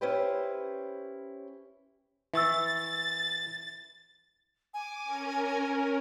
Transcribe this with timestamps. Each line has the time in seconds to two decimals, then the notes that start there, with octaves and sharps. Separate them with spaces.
0.01 C#4 E4 G4 B4 C5
2.34 E3 E5 C#6 E6 A6
4.74 G#5 D6
5.04 C#4 A#4